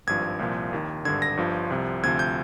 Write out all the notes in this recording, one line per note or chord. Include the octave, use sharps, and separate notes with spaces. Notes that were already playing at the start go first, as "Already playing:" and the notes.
G#1 G2 F3 G#6
C2 A#2 F3
D#2 D#3
G#1 G2 D3 G#6
A#6
G1 G2 F3
C2 C3 F3
D2 C3 F3 G#6
G6